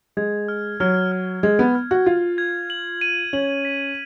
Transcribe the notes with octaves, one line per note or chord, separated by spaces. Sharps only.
G#3 G#6
F6
F#3 F6
F6
G#3 G#6
B3
F6
F#4
F4 G#6
G#6
F#7
D#7
C#4 F#7
B6